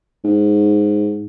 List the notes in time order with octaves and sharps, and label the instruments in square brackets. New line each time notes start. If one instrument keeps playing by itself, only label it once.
[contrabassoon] G#2